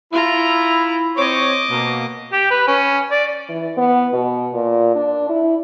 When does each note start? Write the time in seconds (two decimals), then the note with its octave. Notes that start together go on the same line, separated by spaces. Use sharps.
0.13 E4 F4 A#5
1.17 C4 C5 C#5 D#5 D6
1.70 B2 A#3
2.33 G4
2.51 B4
2.68 C#4
3.12 D5
3.49 E3
3.77 B3
4.13 B2
4.53 A#2
4.95 D4
5.29 E4